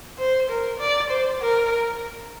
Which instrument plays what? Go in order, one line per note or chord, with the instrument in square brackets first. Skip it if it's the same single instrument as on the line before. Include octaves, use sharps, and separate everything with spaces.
[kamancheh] C5
A#4
D5
C5
A#4